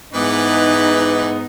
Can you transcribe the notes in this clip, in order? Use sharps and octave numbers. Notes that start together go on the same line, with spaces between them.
G#2 E3 B3 D#4 B4 D6